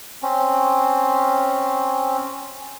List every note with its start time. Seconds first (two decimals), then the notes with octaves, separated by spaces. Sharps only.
0.22 C4 C#4